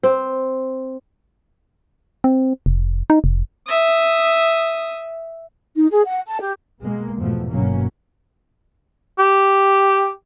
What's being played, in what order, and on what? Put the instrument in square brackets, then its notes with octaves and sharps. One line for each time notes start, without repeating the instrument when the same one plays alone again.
[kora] C4
[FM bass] C4
F1
D#4
F1
[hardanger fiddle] E5 D#6
[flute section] D#4
G#4
F#5
A5
G4
[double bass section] B2 G#3 A#3
E2 G#2 B2 F3 A3
G1 B2 F#3 A#3 C#4
[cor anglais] G4